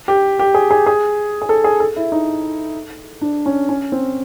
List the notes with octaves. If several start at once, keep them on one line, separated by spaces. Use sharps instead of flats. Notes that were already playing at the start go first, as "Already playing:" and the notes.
G4
G4
G#4
G#4
G#4
G#4
A4
G#4
A4
E4
D#4
D4
C#4
C#4
C4